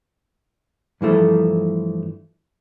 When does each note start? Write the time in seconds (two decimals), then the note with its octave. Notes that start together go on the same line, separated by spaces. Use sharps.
1.01 G2 E3 F3 A3